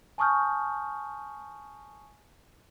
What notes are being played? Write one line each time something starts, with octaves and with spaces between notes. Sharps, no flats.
G#5 A5 C#6 D#6 F6 G6